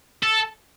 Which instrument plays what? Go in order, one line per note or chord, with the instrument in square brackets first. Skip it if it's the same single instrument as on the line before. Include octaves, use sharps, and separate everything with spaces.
[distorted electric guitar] A4